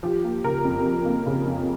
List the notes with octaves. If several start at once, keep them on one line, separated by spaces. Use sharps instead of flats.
F3 G4
A#3
C#3 A#4
F2
F3
A#3
C#3
F2